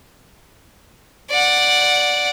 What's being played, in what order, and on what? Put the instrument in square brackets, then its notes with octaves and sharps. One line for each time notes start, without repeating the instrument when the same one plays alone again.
[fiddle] D5 F#5